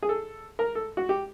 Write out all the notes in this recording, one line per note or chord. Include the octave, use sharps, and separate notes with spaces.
G#4
A4
A#4
A4
F#4
G4